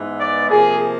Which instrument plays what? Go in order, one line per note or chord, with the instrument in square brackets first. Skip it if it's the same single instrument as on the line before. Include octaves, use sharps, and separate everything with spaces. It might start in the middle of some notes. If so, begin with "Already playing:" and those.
Already playing: [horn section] G#2 E3 G#3 B3
D5
C3 F3 A#3 G#4